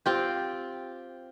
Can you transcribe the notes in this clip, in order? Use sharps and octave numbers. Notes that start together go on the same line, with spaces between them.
C4 F4 G4